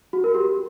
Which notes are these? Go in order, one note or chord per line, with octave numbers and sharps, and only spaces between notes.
F#4
A#4
G4